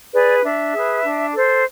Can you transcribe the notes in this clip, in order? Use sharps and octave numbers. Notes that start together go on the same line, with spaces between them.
G#4 B4 D5
D4 E5
G#4 B4
D4
A4 C5